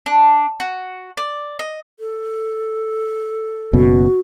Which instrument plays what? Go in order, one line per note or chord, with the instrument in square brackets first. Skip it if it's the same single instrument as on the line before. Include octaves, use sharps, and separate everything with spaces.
[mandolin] D4
F#4
D5
D#5
[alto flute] A4
[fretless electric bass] F#1 F#2 B2 [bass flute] F#4